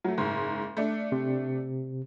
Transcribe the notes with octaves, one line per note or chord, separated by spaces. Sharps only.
F#3 A3
F#1 G#2
A3 D4
C3